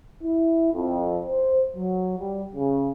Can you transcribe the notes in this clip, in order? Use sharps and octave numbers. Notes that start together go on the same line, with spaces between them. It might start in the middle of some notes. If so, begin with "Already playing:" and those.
E4
F2
C5
F#3
G3
C#3